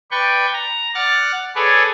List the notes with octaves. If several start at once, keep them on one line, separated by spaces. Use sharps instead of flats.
B4 D5 G5 C#6
A#5
D5 F#5 F6 F#6 A6
G#4 A4 B4 C#5 D5